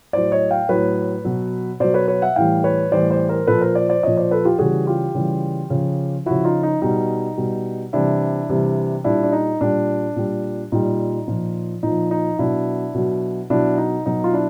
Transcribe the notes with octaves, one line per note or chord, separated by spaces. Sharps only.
A2 F#3 C5 D5
C#5 D#5
F5 G5
A2 F#3 B4 C#5
B2 F#3
B2 F#3 C5 D5
B4 C#5
B4 C#5
E5 F#5
A2 E3 G3 F5 G5
B4 C#5
A2 E3 G3 C5 D5
C5 D5
A#4 C5
A#2 F3 A4 B4
A#4 C5
C5 D5
C5 D5
A#2 F3 C#5 D#5
C5 D5
A4 B4
F4 G4
C#3 E3 G3 F#4 G#4
F4 G4
C#3 E3 G3
C#3 F3
C#3 F3 E4 F#4
D#4 F4
D#4
B2 G3 D#4
B2 G3
C3 E3 G3 D4 E4
C3 E3 G3
A#2 G3 D4 E4
D4
D#4
A#2 G3 D4
A#2 G3
A#2 G3 D#4
A#2 F3
A#2 F3 D#4
D#4
B2 F#3 D4 E4
B2 F#3
B2 F#3 D4 E4
D#4
B2 F#3 D#4
F4
D4 E4